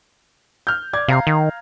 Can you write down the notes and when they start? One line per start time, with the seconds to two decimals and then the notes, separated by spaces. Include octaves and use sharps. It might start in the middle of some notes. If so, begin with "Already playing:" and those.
0.67 F6 G6
0.93 D5 D6 G#6
1.08 C3 F5 A#5 C7
1.27 D#3